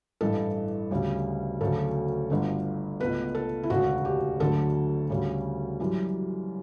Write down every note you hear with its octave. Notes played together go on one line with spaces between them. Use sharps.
A1 G2 E3 A4
D2 C#3 G3
D2 C#3 F#3 A3 A4
G1 G2 D3 A3
C#2 B2 A3 B4
A4
E4
E1 D2 C#3 F#4
G4
D2 D3 F#3 A3 A4
D2 C#3 G3
F#2 E3 G3